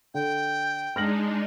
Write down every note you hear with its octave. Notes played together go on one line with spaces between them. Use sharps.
D3 G5
G#3 D4 D#4 F6 A#6 F#7